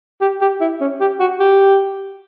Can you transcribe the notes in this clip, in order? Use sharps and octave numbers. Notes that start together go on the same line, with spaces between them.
G4
G4
E4
C#4
G4
F#4
G4